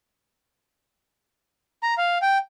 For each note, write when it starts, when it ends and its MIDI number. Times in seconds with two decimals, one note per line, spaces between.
1.83 1.94 82
1.98 2.18 77
2.22 2.38 79